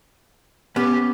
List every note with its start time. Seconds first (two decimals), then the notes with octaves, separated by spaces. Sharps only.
0.76 B3 C#4 G4